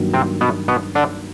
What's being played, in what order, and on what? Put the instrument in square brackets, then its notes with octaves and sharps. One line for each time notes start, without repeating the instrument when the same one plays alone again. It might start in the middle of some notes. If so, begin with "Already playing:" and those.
Already playing: [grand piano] G2 D#3 F#3 A#3
[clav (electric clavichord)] C3 C4
B2 B3
B2 B3
D3 D4